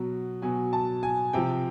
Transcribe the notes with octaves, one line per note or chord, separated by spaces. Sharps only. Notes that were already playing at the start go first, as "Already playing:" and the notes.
Already playing: B2 F#3
B2 F#3 G#5
A5
G#5
C3 F3 G5